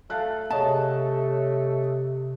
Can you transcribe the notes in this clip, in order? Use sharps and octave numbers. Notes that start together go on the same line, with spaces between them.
A3 F5 A5 F#6
C3 G#4 C#5 D#5 A5